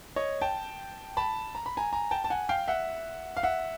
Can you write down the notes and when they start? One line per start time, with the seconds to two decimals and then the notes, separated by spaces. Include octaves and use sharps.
0.16 C#5 D#5
0.41 G5 A5
1.17 A5 B5
1.55 A#5
1.66 B5
1.77 G#5 A#5
1.93 G#5 A#5
2.11 G5 A5
2.24 A5
2.30 F#5 G#5
2.49 F5 G5
2.68 E5 F#5
3.37 F5
3.43 E5 F#5